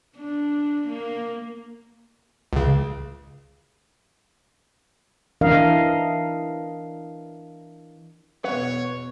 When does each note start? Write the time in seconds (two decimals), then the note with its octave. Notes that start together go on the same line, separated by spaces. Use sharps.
0.18 D4
0.88 A#3
2.53 C#2 C#3
5.41 E3 D4 A#4 D#5 F5
8.44 E2 B2 B4 C#5 F#5